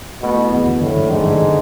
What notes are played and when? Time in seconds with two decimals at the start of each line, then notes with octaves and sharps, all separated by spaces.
0.22 B2 A3
0.37 E4
0.52 E2 B2
0.67 D3
0.81 A2 D3
0.96 D3
1.10 G#2 D3
1.25 D3
1.41 D3